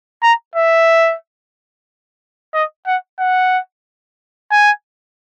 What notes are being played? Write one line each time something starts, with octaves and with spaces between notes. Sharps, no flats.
A#5
E5
D#5
F#5
F#5
G#5